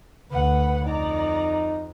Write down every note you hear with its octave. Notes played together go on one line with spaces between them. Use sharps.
D2 B4 F#5
F2 D#4 D5 A#5